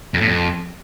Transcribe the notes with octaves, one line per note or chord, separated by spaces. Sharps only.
F2
A2
F2